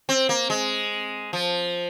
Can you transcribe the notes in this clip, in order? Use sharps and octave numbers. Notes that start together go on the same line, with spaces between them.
C4
A#3
G#3
F3